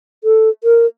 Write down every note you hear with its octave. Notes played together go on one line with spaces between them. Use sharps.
A4
A#4